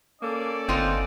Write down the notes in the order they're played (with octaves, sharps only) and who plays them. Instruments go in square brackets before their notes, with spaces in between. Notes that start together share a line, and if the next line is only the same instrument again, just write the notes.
[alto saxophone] A#3 [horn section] C#4 A4 D5
[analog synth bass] G1 [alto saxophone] C4 [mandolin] D#4 F4 F#5